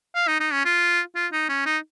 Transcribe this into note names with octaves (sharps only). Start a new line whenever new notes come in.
F5
D#4
D#4
C#4
F4
F4
D#4
C#4
D#4